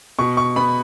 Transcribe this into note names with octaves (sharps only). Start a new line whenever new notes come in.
B2 C#6
C#6
B3 B5